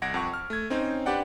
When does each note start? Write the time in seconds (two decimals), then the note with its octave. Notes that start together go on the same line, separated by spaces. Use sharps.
0.02 C2 F#5 G#6 A#6 D7
0.14 F2 F#5 C#6
0.34 F6
0.50 A3 G#6
0.70 C4 C#4 D#4 C5 C#5
1.06 D4 G4 B4 D5 F#5 G5